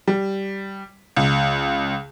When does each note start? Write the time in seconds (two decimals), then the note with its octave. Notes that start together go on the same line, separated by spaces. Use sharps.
0.07 G3
1.16 C#2